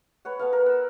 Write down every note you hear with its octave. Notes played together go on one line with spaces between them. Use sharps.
B4 C#5 F#5
B3 A4 F5
A#4
F#5 E6